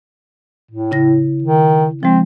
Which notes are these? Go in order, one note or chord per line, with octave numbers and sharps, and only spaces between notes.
A2
C#3 E4 A#6
D#3
F3 G#3 C4